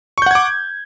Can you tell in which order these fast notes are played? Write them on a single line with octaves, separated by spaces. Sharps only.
C#6 G6 F#5 G#6 D6